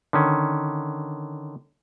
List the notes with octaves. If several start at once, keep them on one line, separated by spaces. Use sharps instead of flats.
D3 D#3 C#4